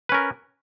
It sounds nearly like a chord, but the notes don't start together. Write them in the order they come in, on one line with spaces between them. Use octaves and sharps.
B4 C#4 A#4